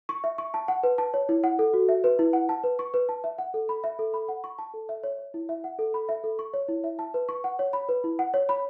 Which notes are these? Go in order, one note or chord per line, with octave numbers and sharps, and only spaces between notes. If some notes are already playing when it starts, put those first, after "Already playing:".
C#6
E5
C#6
A5
F#5
B4
A5
C#5
E4
F#5
A4
F#4
E5
B4
E4
F#5
A5
B4
C#6
B4
A5
E5
F#5
A4
B5
E5
A4
B5
F#5
C#6
A5
A4
E5
C#5
C#5
E4
E5
F#5
A4
B5
E5
A4
C#6
C#5
E4
E5
A5
B4
C#6
F#5
C#5
B5
B4
E4
F#5
C#5
B5